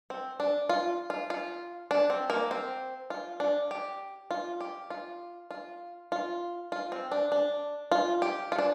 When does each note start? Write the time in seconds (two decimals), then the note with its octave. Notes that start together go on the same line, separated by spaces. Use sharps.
0.10 C4
0.40 D4
0.69 F4
1.10 F4
1.30 F4
1.91 D4
2.10 C4
2.30 A#3
2.51 C4
3.10 F4
3.40 D4
3.71 G4
4.31 F4
4.60 G4
4.90 F4
5.51 F4
6.12 F4
6.72 F4
6.92 C4
7.12 D4
7.32 D4
7.92 F4
8.22 G4
8.52 F4
8.58 D4